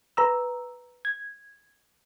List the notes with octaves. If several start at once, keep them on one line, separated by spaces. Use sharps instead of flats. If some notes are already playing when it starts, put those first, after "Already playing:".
B4 A#5 E6
G#6